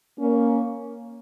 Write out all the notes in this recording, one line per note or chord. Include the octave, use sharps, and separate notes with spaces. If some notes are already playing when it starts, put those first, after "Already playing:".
A#3 C#4